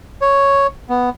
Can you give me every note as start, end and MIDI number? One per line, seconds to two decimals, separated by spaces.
0.21 0.67 73
0.89 1.10 59